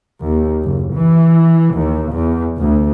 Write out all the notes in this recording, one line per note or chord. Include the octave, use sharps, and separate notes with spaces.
D#2
F#1
E3
D#2
E2
D2